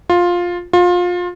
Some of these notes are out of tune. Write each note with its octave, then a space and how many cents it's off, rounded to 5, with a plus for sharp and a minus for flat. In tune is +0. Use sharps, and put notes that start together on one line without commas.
F4 +10
F4 +25